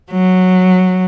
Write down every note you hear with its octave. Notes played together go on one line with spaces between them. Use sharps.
F#3